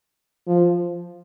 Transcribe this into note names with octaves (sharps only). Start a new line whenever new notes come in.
F3